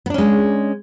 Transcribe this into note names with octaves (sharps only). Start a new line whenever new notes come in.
G#3 B3 C#4 D4